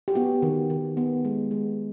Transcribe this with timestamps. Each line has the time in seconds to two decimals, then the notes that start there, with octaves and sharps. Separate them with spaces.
0.08 G4
0.15 B3 F#4
0.42 D#3
0.70 D#3
0.97 B3
1.25 G#3
1.51 G#3